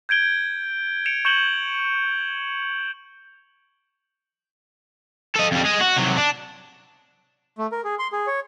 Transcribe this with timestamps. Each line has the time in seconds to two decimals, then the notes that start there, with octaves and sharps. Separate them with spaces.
0.09 G6 G#6 D7 G7
1.06 C#7 D7 E7 F7
1.25 C#6 G6 C#7 E7 F#7 G7
5.35 A4 D#5
5.51 F2 G3
5.65 G#3 G#4
5.80 F#4
5.97 C3 F#3
6.17 D4
7.58 A3
7.72 A#4
7.84 G#4
7.99 C6
8.12 G#4
8.27 C#5